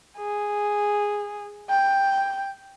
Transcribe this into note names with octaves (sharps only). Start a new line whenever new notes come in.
G#4
G5